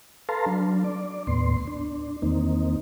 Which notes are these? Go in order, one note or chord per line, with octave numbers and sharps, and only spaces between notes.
A4 B4 F5 A5 A#5 C6
F#3 D4
D5
D#2 A2 B3 C6
D4
E2 D#3 A#3 C4 D#4